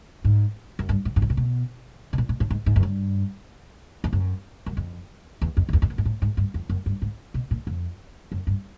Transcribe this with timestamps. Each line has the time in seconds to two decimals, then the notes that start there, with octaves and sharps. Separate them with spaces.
0.24 G#2
0.79 F#2
0.89 G2
1.05 A2
1.16 G#2
1.22 A2
1.30 A#2
1.37 B2
2.13 B2
2.18 A#2
2.29 A#2
2.40 A2
2.50 G#2
2.66 G#2
2.76 F#2
2.83 G2
4.04 F2
4.13 F#2
4.66 F#2
4.77 F2
5.42 E2
5.57 F2
5.69 F2
5.73 E2
5.82 F2
5.90 F#2
5.98 G#2
6.05 A2
6.22 G#2
6.37 G2
6.54 F2
6.70 F#2
6.86 G2
7.02 G#2
7.34 B2
7.51 A#2
7.67 F2
8.32 F#2
8.47 G2